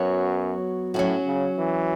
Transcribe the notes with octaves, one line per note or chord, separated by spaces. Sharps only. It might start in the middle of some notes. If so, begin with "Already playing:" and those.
Already playing: F#2 F#3 B3 F#4 C#5
A2 F#3 C#4 F#4
C#3
E3